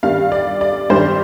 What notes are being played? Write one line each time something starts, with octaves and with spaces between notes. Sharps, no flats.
G2 D#3 G3 F5
D5
D5
G2 D#3 G3 C5